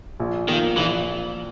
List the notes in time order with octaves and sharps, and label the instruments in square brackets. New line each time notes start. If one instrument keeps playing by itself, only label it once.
[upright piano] A#1
[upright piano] A#2 A#3 [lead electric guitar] D#3
[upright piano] A#1 [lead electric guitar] E3